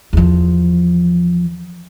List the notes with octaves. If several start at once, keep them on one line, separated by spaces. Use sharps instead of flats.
E2 F3